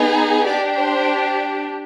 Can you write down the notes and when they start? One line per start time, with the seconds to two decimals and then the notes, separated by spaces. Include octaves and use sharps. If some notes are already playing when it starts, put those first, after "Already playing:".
Already playing: B3 D#4 G#4
0.47 D4 G4 D5
0.78 C5